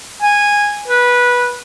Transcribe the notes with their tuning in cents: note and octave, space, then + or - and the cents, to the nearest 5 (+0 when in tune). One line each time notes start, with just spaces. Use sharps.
G#5 -10
B4 -15